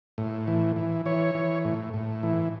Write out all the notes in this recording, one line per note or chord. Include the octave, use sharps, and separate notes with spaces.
A2
E3
E3
E3 C#5
E3
A2
A2
E3